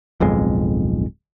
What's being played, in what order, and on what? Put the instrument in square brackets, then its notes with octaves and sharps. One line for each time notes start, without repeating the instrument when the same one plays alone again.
[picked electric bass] D1 B1 F2 G#3